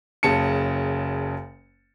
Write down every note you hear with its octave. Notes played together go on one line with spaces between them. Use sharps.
F#1 C#3 A5 C#7